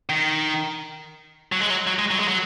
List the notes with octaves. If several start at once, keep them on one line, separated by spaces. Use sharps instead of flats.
D#3
F#3
G#3
F#3
F#3
G#3
F#3
G#3
F#3